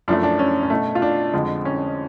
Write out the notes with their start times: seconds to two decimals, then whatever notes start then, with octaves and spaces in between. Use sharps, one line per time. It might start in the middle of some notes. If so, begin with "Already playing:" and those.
0.08 F#2 F3 A3 D4
0.23 D4
0.39 C#4
0.63 C#4
0.70 B2 A3
0.95 F4
1.02 D4
1.33 F2 D3 F3 G#3
1.65 C#4